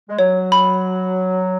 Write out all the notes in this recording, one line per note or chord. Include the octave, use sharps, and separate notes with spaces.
G#3
F#3 C#5
B5